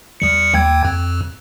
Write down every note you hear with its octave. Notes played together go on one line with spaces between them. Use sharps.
E2 G3 C#7
D#2 G5 G#6
F2